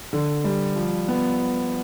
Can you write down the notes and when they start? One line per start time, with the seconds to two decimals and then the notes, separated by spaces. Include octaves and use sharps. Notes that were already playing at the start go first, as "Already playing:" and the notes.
0.13 D3
0.44 G3
0.76 F3
1.08 B3